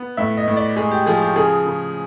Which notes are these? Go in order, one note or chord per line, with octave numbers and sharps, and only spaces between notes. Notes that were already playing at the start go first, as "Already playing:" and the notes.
Already playing: B3
A2 E5
D#5
A2
D5
G#3 G#4
G4
F3 G#4
G4
C#3 G#4
C#3